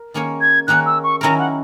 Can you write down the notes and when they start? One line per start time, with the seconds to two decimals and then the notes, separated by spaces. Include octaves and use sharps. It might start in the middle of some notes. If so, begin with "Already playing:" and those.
Already playing: A#4
0.14 D#3 A#3 C#4 G#4 C#5
0.41 G#6
0.67 D#3 A#3 C#4 G#4 C#5 F#6
0.86 E6
1.03 C#6
1.21 D#3 F#3 C#4 E4 A#4 A#5
1.39 F#5